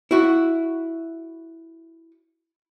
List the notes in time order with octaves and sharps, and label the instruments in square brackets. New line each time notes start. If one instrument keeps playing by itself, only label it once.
[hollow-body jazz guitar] E4 F#4